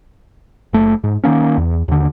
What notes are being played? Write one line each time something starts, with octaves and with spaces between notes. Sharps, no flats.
F#1 A3
G#2
D#3 F#3 A#3 C#4
E2
D#2 D3